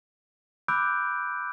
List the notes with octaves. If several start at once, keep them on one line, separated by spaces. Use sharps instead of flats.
B5 D6 E6 F#6 G6 D7